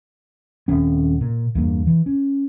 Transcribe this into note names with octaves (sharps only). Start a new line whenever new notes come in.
D#1 C4 C#4
A#2
E2 G2 A#3
E3
C#4